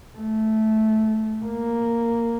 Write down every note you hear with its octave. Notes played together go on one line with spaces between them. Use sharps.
A3
A#3